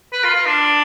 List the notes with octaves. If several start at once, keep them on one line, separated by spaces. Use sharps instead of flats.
B4
F4
F4
D4